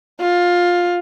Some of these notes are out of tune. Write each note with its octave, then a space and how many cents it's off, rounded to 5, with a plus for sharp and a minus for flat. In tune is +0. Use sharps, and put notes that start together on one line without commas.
F4 +15